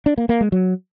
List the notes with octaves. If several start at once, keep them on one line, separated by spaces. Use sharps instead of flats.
D4
A#3
A#3
G#3
F#3